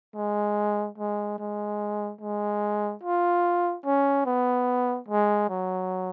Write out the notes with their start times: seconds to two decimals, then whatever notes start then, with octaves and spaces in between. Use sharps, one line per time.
0.15 G#3
0.98 G#3
1.39 G#3
2.21 G#3
3.03 F4
3.85 C#4
4.26 B3
5.08 G#3
5.49 F#3